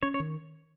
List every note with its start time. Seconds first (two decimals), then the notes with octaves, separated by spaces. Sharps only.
0.03 C#4 C#5
0.14 C#5
0.20 D#3